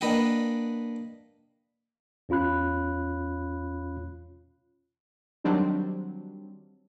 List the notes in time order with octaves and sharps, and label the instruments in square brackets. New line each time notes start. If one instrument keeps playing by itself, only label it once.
[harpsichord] A#3 D4 B4 D#5 F#5 G5
[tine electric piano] E2 C#4 F4 B5 F#6
[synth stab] D#3 F#3 G3 C4 D4